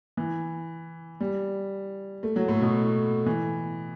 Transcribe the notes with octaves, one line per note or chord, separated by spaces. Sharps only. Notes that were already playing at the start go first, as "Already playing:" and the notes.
E3
G3
A3
F#3
A2
B2
E3